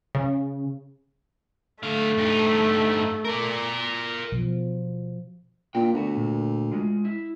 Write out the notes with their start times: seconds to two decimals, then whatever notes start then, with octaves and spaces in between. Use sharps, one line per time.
0.15 C#3
1.83 D3 A3 F5
2.18 G2 D#4
3.25 A#4 D5
4.32 B2 F3
5.75 A#2 A#3 D4 G5
5.94 D2 B3 F#4
6.16 A#2
6.72 G#3 F4
7.05 E4